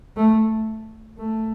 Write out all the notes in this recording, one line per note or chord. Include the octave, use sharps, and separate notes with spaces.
A3
A3